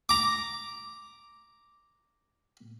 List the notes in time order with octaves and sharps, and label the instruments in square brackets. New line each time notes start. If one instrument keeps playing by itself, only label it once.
[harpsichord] A#5 D6